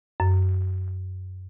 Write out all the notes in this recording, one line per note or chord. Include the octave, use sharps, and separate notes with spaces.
F#2